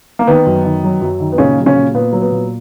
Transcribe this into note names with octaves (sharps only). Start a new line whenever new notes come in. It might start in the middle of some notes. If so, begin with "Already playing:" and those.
A#3
D#3 B3
F#2
D#3
F#3
F#2
D#3
B3
A#2 C#3 C#4
F#3
C#3 C#4
A#2
A#2 B3
F#3
B3
A#2